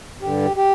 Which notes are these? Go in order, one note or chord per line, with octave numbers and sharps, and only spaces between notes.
G2 D3 G3 G4
G4